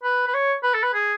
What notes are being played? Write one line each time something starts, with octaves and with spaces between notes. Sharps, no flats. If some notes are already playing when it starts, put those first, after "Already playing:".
B4
B4
C#5
B4
A4
B4
G#4